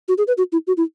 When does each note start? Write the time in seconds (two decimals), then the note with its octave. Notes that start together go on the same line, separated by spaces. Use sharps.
0.08 F#4
0.18 G#4
0.27 B4
0.38 F#4
0.52 E4
0.67 F#4
0.77 E4